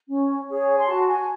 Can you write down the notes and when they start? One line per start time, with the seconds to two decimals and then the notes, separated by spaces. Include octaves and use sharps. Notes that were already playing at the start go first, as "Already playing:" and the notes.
0.09 C#4
0.49 G#4 C#5
0.68 G#5
0.79 C6
0.87 F#4 A5
1.07 G#5